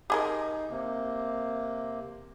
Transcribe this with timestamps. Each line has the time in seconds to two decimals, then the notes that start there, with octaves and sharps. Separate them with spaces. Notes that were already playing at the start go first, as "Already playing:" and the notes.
0.10 D#4 G4 G#4 A#4
0.70 C3 A#3